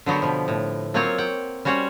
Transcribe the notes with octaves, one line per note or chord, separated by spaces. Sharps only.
D3 F#3 B3 F#4 G4
B2 F3
A2
F#3 A#3 C4 F4 C5 C#5
F#5 G5
G3 C#4 F#4 C5 C#5